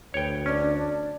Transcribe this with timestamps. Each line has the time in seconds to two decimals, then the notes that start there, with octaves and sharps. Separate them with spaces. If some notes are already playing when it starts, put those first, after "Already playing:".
0.14 D2 B4 C#5 G5
0.46 C#4 D4 D5